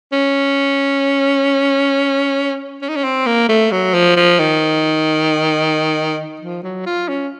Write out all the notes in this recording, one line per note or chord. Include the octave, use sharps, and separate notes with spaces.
C#4
C#4
D#4
C#4
C4
A#3
A3
F#3
F3
F3
D#3
F3
F#3
F4
C#4